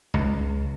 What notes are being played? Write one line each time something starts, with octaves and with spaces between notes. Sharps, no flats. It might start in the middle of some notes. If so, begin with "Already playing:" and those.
C#2